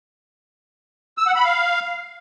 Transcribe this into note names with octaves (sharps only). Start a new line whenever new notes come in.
E6
F#5
B5
F5